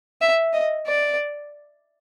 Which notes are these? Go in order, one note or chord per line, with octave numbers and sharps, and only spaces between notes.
E5
D#5
D5